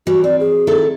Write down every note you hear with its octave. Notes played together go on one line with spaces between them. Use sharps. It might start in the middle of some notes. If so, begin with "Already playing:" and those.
E3 G3 F#4
C4 D5
G#4
D#3 E4 A4